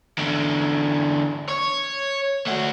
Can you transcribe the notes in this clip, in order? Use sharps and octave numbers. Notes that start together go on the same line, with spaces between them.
E2 D3
C#5
A3 F#4